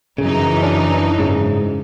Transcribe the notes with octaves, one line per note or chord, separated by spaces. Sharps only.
F#2 C#3 E3 D#4
C#4 D4
G#2 C#3